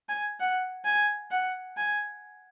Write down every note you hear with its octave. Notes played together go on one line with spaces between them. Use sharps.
G#5
F#5
G#5
F#5
G#5